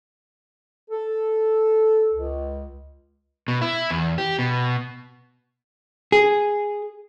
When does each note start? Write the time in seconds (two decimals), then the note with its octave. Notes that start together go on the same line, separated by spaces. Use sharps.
0.90 A4
2.13 C#2
3.48 B2
3.61 E4
3.91 E2
4.18 G4
4.39 B2
6.12 G#4